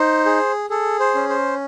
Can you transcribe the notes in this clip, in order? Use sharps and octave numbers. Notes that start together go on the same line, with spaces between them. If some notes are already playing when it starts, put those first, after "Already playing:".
Already playing: D#4 C5
G#4
G#4 A4
C5
C#4
C5